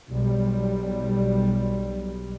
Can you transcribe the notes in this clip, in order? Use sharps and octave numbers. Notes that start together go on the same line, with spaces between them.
B1 G3